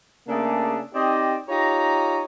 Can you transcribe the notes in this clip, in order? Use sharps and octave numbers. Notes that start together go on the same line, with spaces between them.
C#3 A3 A#3 D4 G#4 A4
C4 D#4 G4 D5 D#5
D#4 F4 G4 C#5 A#5